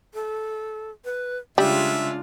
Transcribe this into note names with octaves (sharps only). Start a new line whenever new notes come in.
A4
B4
C#3 G3 G#3 D4 F4 E5